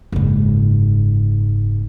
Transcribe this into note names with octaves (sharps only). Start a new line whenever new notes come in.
F#1 G#2